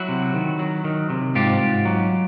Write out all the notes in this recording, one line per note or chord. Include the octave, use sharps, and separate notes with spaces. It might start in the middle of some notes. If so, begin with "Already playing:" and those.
Already playing: F#3 E4 F#4
C3
D#3
F#3
D#3
C3
G#2 F4 G4
G#2
F#3